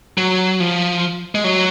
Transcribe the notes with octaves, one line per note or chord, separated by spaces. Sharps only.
F#3
F3
G#3
F#3